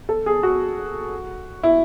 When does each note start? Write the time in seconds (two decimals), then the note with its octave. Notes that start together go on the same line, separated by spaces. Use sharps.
0.09 A4
0.26 G#4
0.43 F#4
1.63 E4